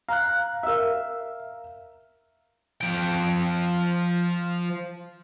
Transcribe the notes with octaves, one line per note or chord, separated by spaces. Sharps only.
F5 A#5 F#6
A#4 E5 F5 E6
F3 G5